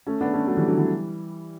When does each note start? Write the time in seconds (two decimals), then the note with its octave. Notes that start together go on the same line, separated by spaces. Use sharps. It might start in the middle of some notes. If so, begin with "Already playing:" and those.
0.07 A3 C#4
0.21 B3 D4
0.33 A3 C#4
0.47 F#3 A3
0.57 E3 G3
0.67 D3 F#3
0.78 E3 G3